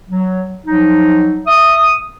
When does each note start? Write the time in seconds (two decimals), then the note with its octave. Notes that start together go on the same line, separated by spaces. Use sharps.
0.08 F#3
0.66 F3 F#3 D#4
1.47 E5 D#6